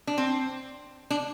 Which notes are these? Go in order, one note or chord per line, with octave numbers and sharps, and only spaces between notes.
D4
C4
D4